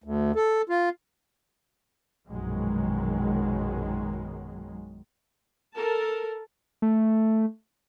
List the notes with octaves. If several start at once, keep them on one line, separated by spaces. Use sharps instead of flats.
D2
A4
F4
A#1 F#2 B2 D#3 F#3 G#3
A4 A#4 A5
A3